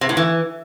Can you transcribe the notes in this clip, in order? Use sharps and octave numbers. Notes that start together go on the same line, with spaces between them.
C3
A2
E3